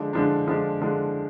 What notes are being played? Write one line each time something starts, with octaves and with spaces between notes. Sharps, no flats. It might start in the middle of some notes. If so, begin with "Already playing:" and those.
Already playing: D3 F3 G#3 D4
D3 F3 G#3 D4
D3 F3 G#3 D4
D3 F3 G#3 D4